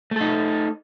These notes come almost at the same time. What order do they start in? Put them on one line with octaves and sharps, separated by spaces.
A3 A4 D#4